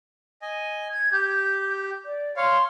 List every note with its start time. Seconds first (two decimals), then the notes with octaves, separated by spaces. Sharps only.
0.42 D#5 G#5
0.91 G#6
1.12 G4 G6
2.06 D5
2.37 C#5 F5 C6